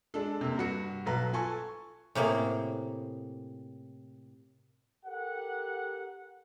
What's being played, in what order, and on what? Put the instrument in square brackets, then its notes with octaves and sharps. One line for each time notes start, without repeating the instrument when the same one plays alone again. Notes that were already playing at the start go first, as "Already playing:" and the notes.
[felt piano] G#3 D4 A4
C3 A#3
G2 F#4 C#7
B1 A4 B4 A#5
F4 A4 G#5 A5 C#6
[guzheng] A2 C3 A#3 G#4
[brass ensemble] G4 A4 A#4 F#5